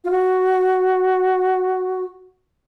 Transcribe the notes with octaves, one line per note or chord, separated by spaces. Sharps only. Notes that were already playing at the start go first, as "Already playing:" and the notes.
F4
F#4